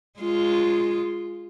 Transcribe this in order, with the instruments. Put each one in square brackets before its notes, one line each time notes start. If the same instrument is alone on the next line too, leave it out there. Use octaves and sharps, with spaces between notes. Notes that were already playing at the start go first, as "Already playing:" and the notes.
[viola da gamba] G#3 F4